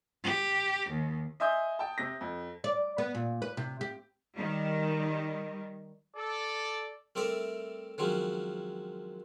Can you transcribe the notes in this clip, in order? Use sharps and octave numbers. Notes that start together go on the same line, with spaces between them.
G4
D#2
D#5 E5 G#5 C6 D#6 G6
G5 A5
C3 A#6
F2
D5
B3
A#2
B4
C3
G4
D#3 G3
A4 D5
G3 A3 C4 A#4 D5 E5
D#3 F3 F#3 G#3 C4 C#4